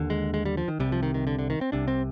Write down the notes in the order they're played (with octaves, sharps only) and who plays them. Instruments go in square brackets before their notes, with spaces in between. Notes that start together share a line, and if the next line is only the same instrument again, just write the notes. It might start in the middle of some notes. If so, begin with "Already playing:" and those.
Already playing: [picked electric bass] D#2 D3
G#3
G#3
G3
F3
D#3
C2 C3 G3
F3
D#3
D#3
D3
D3
D#3
C4
C2 C3 D4
C4